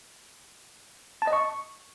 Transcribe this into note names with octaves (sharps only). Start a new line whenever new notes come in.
A5
D#5
C#6